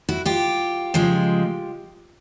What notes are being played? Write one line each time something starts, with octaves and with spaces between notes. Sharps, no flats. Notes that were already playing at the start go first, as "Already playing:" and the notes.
E4 F#4
F4 G4
C#3 F3 G#3